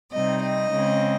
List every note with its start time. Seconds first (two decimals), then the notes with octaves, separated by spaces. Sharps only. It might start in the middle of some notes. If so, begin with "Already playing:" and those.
0.12 C3 G3 C4 D#4 D#5
0.42 D#5
0.71 C#3 G#3 C4